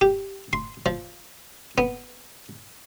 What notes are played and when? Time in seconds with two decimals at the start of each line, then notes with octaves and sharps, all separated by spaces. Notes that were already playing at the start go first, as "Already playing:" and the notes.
0.01 G4
0.53 C6
0.86 F3
1.78 B3